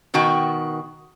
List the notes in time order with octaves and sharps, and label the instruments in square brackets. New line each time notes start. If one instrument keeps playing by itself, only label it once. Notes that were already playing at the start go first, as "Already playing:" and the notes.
[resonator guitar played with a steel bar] B2 D#3 F#4 G5